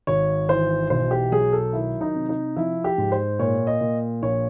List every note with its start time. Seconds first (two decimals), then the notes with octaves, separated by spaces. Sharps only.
0.07 G#1 C#5
0.49 E3 C5
0.90 B1 C5
1.11 G4
1.32 F#3 G#4
1.53 A4
1.73 D#3 E4
2.01 D#4
2.15 C3
2.29 D#4
2.56 F3 E4
2.84 G4
2.98 G#2
3.12 C5
3.39 A#2 C#5
3.67 D#5
3.81 A#2
4.22 A#1 C#5